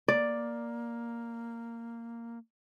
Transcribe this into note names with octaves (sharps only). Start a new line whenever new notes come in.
A#3 D5